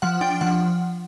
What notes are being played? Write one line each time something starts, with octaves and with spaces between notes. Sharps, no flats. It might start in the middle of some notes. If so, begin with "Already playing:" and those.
F3 F#5
D4 G5
F3 F#5